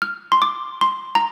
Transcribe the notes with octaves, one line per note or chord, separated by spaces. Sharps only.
F6
C6
D6
C6
A#5